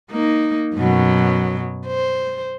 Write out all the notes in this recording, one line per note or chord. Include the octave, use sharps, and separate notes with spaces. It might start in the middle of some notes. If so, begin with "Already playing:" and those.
A#3 D#4
F#2 B2 F#3
C5